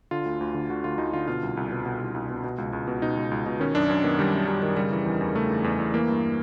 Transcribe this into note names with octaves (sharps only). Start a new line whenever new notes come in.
D3 F4
D2
D2
D3
D3 F#4
D2 F4
D2 D#4
D3 F4
B2 F4
C2
C2
B2
B2
C2
C2
B2
B2
C#2
C#2
B2
B2 D#4
C#2
C#2
B2
D#3 C#4
F#2 D4
F#2 C#4
D#3 B3
D#3 G3
F#2
F#2 G3
D#3
C#3 G3
E3
E2
E2
C#3 A3
E3
E2
E2
E3 A#3
G2